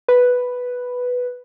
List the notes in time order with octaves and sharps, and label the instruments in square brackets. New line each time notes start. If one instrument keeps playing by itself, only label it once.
[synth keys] B4